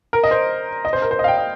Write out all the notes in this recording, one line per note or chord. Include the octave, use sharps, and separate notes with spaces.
A#4
D#5
C5
D#5
C5
A#4
C5
D#5
F5
G5
D#5